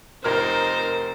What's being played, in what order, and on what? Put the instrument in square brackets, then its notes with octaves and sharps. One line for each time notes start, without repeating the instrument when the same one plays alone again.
[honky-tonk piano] F1 A#4 F6 [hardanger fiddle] D#4 [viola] C5